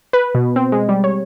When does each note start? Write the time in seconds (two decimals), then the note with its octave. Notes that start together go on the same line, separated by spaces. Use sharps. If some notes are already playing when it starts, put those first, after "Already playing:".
0.13 B4
0.35 B2
0.56 C4
0.72 G#3
0.89 G3
1.04 C#5